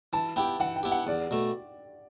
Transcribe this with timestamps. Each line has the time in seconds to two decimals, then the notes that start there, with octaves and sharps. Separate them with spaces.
0.13 E3 A5
0.36 B3 E4 G4 G5
0.60 E3 F#5
0.76 G5
0.83 B3 E4 G4
0.92 F#5
1.07 E2 D5
1.31 B2 A3